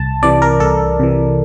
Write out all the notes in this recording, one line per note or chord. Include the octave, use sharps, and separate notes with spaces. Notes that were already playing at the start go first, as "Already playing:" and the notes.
Already playing: C2 A5
C3 E3 D5
A#4
C2 A4
C3 E3